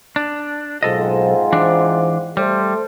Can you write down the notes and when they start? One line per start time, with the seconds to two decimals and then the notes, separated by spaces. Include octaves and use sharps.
0.16 D4
0.83 B1 G#2 C4 F4 A4 D#5
1.52 E3 D4
2.37 G3 A3 A4 C5